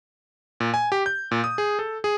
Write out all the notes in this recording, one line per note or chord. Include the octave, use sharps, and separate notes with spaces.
A#2
G#5
G4
G6
A#2
D#6
G#4
A4
G#4